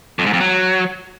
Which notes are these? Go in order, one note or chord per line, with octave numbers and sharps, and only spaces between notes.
F2
G#2
F2
F#3